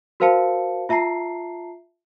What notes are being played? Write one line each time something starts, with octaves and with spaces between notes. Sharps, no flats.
F#4 A#4 C5 F5 A5 C#7
F4 E5 A5 A#5 C7